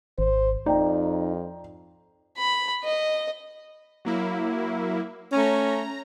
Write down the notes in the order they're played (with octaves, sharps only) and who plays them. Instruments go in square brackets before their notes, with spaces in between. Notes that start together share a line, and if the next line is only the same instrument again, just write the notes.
[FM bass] G#1 [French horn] C5
[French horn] F2 [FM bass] D#4 [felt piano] D5 G5 A#5
[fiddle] B5
D#5
[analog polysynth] F#3 A#3 E4
[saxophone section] A3 C#4 [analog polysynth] A#5